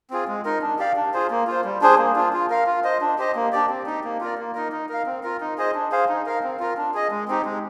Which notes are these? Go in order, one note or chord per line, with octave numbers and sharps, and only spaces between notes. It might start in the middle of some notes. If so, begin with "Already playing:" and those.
C4 F4 G#4
G#3
D#4 A#4
D4
G4 D5 F5
D4
F4 G#4 C5
A#3
F4 C5
G3
D4 G#4 C5
A#3
D4 F4
F4
A#4 F5
F4
C5 D#5
D4
G4 C5 D#5
A#3
D4 G4 D5
C4
D#4 G4
A#3
F4 A#4 D5
A#3
D#4 A#4
D#4
A#4 F5
C4
F4 A#4
D#4
G#4 C5 D#5
D4
G#4 C5 F5
D#4
A#4 F5
C4
F4 A#4
D4
G#4 D#5
G#3
C4 D#4 G4
G#3